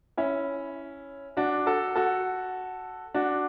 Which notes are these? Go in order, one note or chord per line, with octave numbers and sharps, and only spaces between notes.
C#4 E4
D4 F#4
F#4 A4
F#4 A4
D4 F#4